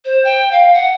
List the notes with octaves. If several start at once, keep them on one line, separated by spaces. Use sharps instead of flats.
C5
G5
F5
F#5